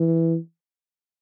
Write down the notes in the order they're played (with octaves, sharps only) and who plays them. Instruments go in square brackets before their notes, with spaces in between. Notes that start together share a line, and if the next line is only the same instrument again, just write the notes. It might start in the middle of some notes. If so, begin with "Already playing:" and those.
Already playing: [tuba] E3